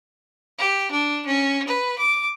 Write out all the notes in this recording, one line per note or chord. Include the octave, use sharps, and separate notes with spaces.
G4
D4
C#4
B4
D6